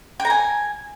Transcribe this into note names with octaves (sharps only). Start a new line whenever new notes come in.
G5
A#5
G#5